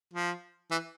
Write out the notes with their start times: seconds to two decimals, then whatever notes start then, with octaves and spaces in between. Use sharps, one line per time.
0.13 F3
0.71 E3